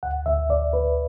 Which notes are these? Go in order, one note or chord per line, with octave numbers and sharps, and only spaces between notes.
D2 F#5
D2 E5
D2 D5
D2 B4